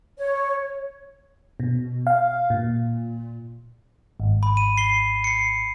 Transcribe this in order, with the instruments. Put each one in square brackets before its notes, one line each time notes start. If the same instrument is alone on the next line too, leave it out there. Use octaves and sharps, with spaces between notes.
[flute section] C#5
[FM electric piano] B2
F5
A#2
G#1
[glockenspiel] B5
D#7
C7 G7
C7 C#7